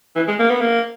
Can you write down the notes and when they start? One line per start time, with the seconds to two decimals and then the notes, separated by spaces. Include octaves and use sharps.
0.16 E3
0.28 G#3
0.39 A#3
0.51 B3
0.61 A#3